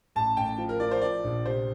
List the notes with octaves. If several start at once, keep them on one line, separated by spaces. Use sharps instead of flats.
A1 A5
A1 G5
F3
A#4
F3 D5
C5
F3 D5
A#1
C3 C5